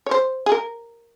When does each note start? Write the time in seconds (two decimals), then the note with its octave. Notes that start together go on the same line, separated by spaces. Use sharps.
0.06 C#5
0.11 C5
0.46 G#4
0.52 A#4